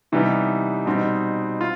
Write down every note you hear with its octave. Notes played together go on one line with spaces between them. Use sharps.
C3 E3 G3 B3 D#4
B2 G3 C4 D#4
F4